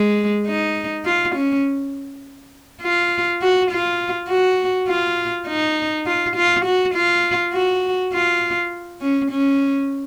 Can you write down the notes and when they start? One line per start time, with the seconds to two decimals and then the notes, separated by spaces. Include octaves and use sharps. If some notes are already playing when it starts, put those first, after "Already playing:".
Already playing: G#3
0.47 D#4
1.05 F4
1.35 C#4
2.82 F4
3.42 F#4
3.71 F4
4.29 F#4
4.88 F4
5.47 D#4
6.06 F4
6.36 F4
6.65 F#4
6.95 F4
7.53 F#4
8.13 F4
9.02 C#4
9.31 C#4